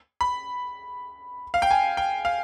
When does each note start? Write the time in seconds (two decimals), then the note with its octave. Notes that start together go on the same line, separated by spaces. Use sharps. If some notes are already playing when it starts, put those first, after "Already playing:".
0.21 B5
1.54 F5
1.62 G5
1.71 G#5
1.97 G5
2.25 F5